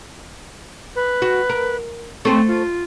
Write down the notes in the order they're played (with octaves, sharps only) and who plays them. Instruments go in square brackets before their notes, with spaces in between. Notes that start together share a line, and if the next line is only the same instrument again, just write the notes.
[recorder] B4
[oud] F#4
A#4
[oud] A3 C5 [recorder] C4
[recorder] F4